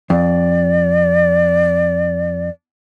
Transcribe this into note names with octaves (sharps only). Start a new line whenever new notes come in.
F2 D5